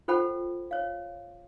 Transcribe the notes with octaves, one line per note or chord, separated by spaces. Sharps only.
F4 A4 C5 F#5 G5 B5
C#5 F5